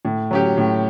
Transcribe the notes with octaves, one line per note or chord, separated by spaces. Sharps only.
A2
F#3 C#4 G4
A2